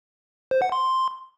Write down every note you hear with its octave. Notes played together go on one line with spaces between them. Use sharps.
C5
F#5
C6